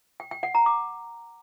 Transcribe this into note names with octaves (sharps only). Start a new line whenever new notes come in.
G5
G5
F#5
A#5
D6